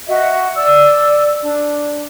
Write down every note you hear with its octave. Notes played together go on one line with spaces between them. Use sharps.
F#4 D#5 E5
D5 E6
D4